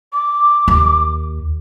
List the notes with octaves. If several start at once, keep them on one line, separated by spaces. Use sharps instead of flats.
D6
D#2